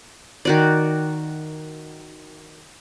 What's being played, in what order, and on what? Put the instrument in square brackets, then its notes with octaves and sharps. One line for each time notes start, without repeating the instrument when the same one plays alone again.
[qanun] D#3 F#4 D5